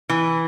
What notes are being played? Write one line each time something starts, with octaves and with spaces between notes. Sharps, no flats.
E3